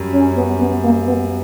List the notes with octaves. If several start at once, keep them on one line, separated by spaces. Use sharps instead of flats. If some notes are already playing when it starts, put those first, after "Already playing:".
Already playing: F#2 G3
C#4
B3
B3
A#3
B3